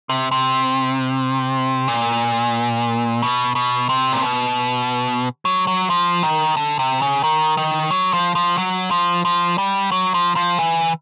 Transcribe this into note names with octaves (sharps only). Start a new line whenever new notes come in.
C3
C3
A#2
B2
B2
C3
A#2
B2
F#3
F#3
F3
D#3
D3
C3
C#3
D#3
D#3
F#3
F3
F3
F#3
F3
F3
G3
F#3
F3
F3
E3